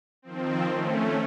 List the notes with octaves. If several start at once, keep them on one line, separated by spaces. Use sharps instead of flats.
D#3 F3 C4
A3 C#4